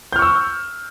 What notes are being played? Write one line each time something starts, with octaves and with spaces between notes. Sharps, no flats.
C#6 E6 F6 G6